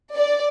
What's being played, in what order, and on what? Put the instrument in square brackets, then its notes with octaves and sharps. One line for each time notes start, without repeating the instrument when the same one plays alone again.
[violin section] D5